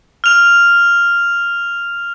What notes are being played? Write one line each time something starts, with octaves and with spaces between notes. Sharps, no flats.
F6 F7